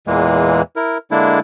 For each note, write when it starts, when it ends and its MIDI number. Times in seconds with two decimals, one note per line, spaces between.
0.07 0.62 40
0.07 0.62 46
0.07 0.62 52
0.07 0.62 56
0.07 0.62 58
0.76 0.98 64
0.76 0.98 70
1.11 1.40 50
1.11 1.40 56
1.11 1.40 58
1.11 1.40 62
1.11 1.40 64